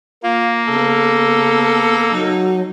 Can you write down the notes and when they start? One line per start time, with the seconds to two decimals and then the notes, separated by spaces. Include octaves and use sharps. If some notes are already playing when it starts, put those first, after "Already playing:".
0.23 A#3 F4
0.68 C#3 B3 A4
2.12 F#3 D#4